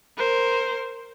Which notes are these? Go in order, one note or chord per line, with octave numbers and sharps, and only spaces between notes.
A#4 C5